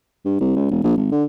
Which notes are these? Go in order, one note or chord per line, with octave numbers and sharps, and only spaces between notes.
G2
C2
C#2
E1
A#1
G#1
D3